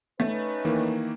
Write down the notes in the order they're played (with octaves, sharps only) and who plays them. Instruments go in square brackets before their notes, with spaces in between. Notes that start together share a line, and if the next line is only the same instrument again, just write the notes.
[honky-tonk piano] A3 [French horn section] C#4 D#4 B4
[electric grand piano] D#3 E3 A#3